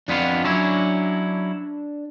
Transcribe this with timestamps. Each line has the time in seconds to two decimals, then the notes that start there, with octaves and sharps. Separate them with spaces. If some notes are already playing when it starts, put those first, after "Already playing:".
0.09 F2 B3 D4 F4
0.44 F#3 C#4 E4